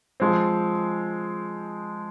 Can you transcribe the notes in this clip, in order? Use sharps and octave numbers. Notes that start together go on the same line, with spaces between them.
F3 G#3 C4